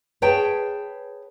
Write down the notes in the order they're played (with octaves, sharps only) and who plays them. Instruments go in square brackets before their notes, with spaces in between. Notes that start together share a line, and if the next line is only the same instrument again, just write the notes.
[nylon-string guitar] G#4 B4 C#5 G5 A5